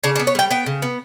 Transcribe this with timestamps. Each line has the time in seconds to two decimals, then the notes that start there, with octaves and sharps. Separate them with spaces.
0.04 C#3 D4
0.16 D4
0.19 B3
0.27 C#5
0.35 G3 G5
0.51 B3 G5
0.66 C#3
0.82 B3